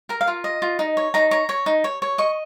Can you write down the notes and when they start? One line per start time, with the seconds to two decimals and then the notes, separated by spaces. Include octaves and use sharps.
0.09 A#4 A#5
0.21 F5
0.27 F4
0.44 D#5
0.62 F4
0.79 D#4
0.97 C#5
1.14 D#4 A#5
1.31 C#5 A#5
1.49 C#5
1.66 D#4
1.84 C#5
2.02 C#5
2.18 D#5 C#6